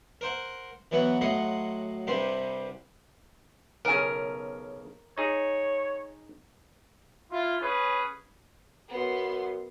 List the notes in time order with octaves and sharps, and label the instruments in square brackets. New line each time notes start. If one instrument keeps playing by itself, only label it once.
[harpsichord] A#4 C5 F#5
E3 F#3 B3 F#4
A2 F#3 D#5 F#5 C6
C2 G2 C3 G3 C6
[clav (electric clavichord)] B1 C#3 [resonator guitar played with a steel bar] A#4 G#5
[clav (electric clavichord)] D#4 G#4 [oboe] C#5
[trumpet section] E4 F4
C#4 G#4 B4 C#5
[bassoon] F#2 [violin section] B3 C6